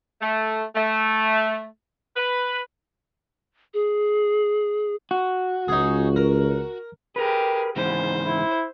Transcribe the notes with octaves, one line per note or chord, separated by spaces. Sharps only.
A3
A3
B4
G#4
F#4
C#2 D#4 G#4
A#4
G4 G#4 A#4 B4
G#2 C#3 E3 C5
E4